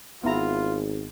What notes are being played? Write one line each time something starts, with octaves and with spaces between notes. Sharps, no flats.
G#1 B3 E4 F4 A#5